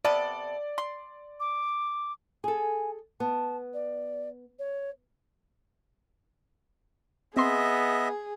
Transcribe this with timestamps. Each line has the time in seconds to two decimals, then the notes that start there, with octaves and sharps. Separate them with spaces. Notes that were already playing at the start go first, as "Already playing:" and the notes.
0.05 C3 B3 A4 D5
0.78 C6
1.40 D6
2.44 G#4 A4 G#5
3.20 B3 A5
3.73 D5
4.59 C#5
7.36 B3 C4 G#4 D#5 E5 C6